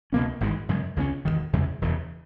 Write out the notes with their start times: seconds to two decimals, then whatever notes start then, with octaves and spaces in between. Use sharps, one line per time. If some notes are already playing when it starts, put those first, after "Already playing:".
0.12 C#2 B2 A#3 C#4
0.41 G#1 G#2 E3 G#3
0.69 F#2 C#3 G#3
0.96 C#2 C#3 G#3 C#4
1.25 E1 D#2 D#3
1.53 E2 C#3 E3 G#3
1.81 E1 E2 C#3